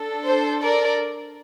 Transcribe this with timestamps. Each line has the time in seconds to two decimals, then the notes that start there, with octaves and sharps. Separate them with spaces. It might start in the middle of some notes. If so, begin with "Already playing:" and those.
Already playing: D4 A4
0.26 C5
0.63 A#4 D5